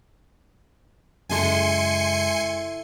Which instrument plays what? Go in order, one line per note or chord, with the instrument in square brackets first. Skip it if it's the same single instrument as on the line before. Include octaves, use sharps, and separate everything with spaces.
[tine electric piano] F#2 C#3 G#3 [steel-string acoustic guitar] E4 A4 [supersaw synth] G#5 C6 C#7